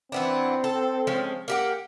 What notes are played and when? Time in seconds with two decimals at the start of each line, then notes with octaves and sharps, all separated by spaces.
0.12 E3 B3 C4 D4
0.64 A4
1.07 F3 G#3 C#4
1.48 A#3 G4 F#5